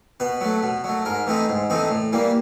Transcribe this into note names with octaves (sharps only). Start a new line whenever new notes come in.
B2 B4
F#3 A3
B2
F#3 A3
G#2 A#4
E3 A3 C4 D#4
G#2
E3 A3 C4 D#4
A2
E3 G3 A#3